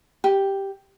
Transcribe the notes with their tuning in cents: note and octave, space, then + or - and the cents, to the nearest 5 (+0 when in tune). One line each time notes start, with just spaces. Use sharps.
G4 +0